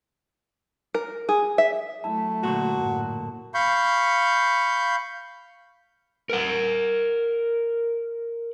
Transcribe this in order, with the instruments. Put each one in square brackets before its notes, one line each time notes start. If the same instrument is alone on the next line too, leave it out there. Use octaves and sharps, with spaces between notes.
[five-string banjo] A#4
G#4
E5
[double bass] F#3 A3 [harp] E4 [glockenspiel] A5
[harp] A#2 D3 [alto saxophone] F#4 [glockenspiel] C#6 E7
[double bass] F#2 A2
[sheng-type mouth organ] F5 B5 C#6 G6
[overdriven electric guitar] A#4 F#5